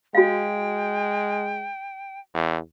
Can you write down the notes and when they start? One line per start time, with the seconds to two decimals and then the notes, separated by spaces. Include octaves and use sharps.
0.15 G#3 F#4 F5 G5
2.34 E2